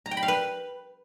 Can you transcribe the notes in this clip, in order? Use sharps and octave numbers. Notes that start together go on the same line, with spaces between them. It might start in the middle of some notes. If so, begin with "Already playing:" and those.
A#5
G5
B5
F5
B4